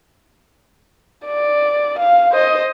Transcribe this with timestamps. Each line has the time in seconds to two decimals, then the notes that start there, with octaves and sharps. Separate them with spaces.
1.26 D5
1.99 F5
2.31 C5 D#5